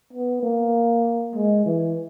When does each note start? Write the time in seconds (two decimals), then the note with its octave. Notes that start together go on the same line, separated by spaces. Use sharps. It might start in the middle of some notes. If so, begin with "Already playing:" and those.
0.13 B3
0.43 A#3
1.35 G#3
1.66 E3